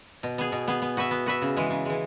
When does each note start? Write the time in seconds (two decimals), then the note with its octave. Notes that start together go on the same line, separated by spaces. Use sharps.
0.23 B2
0.38 B3 G#4
0.52 B2
0.68 B3 G#4
0.82 B3
0.97 F#4 B4 E5
1.11 B3
1.26 F#4 B4 E5
1.42 C#3
1.56 E3 G#3
1.70 C#3
1.85 E3 G#3